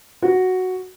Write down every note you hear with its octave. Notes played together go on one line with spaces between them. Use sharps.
F#4